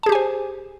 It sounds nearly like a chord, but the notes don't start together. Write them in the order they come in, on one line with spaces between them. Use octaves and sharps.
A5 G#4 G4 G#5 C5